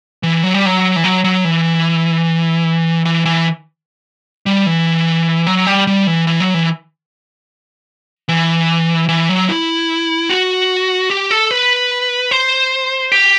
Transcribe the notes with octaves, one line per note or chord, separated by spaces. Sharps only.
E3
F#3
G3
F#3
E3
F#3
F#3
E3
E3
E3
G3
E3
F#3
G3
G3
E3
E3
F#3
E3
E3
E3
F#3
E4
F#4
G4
A4
B4
C5
G4